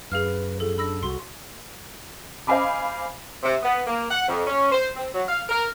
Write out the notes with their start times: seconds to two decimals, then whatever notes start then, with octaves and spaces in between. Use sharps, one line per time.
0.12 F#2 G#4 B4 F5 F6
0.60 F3 G#4 A4
0.78 D4 B5 E6 A#6
1.03 C2 F#4 C6
2.47 C5 D#5 F5 G#5 B5 D6
3.43 C3
3.63 B3
3.87 A#3
4.11 F#5
4.28 F2
4.47 C#4
4.72 C5
4.96 C4
5.15 F#3
5.29 F5
5.49 A#4